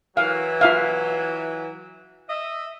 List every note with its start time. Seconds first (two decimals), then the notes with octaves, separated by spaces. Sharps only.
0.17 E3 F#3 F5
0.61 F4 E5 F5
2.29 D#5 E5